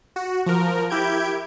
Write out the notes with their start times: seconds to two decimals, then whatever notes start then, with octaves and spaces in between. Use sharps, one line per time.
0.16 F#4
0.46 F3 A#4
0.90 E4 G4 G6 G#6 D7